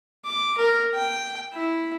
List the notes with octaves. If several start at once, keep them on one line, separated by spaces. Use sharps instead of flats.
D6
A#4
G5
E4